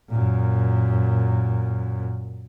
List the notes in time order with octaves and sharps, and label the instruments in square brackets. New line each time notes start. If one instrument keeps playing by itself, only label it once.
[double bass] F#2 A#2